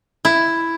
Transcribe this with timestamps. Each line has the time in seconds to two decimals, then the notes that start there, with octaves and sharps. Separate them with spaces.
0.25 E4